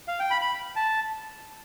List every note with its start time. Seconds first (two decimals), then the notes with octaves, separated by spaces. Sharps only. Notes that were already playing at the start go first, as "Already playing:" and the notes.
0.08 F5
0.20 G5
0.30 B5
0.42 B5
0.76 A5